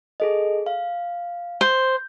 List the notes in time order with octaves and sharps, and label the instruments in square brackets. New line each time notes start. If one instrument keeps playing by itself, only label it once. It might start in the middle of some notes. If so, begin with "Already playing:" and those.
[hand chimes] G#4 A4 D#5
F5
[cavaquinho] C5